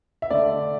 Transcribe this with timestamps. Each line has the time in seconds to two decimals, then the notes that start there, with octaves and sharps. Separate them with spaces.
0.22 E5
0.30 D3 A3 D5